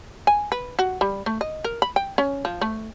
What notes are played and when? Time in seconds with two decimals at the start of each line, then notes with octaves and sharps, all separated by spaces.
0.27 G#5
0.52 B4
0.79 F#4
1.01 G3
1.26 A3
1.41 D#5
1.64 A#4
1.82 B5
1.96 G5
2.18 C#4
2.45 F3
2.61 A3